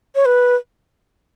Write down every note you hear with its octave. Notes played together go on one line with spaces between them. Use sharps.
C#5
B4